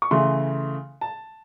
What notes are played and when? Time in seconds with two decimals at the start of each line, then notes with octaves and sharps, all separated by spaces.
0.02 C#6
0.11 C#3 E3 A3 C6
1.01 A5